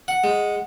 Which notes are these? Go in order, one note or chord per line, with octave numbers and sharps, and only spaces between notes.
F#5
G#3